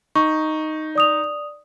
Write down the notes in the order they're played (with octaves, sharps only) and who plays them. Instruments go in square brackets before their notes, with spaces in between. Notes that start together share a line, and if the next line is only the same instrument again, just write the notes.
[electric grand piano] D#4 [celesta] C#6
[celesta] D5 D#6 F7